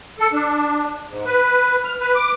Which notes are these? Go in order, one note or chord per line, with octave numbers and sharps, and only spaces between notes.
A4
D4
G#2
B4
F6
B4
D6